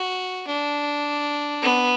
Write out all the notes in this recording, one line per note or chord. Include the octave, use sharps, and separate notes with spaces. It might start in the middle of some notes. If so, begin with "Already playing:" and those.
Already playing: F#4
D4
B3